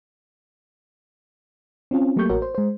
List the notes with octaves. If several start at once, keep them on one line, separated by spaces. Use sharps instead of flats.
C4 C#4 F4
F#3 A3 A#3 G4 C#6 G6
A1 F#4 A#4 C#5
C5
G#3 C5